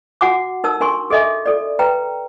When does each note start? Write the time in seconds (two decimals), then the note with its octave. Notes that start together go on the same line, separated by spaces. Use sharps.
0.21 F#4 F#5 G#5 D6
0.64 D#4 A#4 A5 E6
0.80 D4 A#4 G#5 C6 C#6
1.10 G#4 A4 D#5 E5 G#5
1.46 A4 D5
1.79 B4 G5 A#5